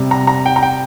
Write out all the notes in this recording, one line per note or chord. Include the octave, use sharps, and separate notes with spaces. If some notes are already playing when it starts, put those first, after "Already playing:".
Already playing: C3 G3
A#5
A#5
G5
A#5
G5